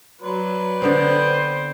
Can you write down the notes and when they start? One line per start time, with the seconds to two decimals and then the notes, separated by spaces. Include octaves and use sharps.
0.22 F#3 B4 D5 C6
0.82 D3 B3 C4 C5 G5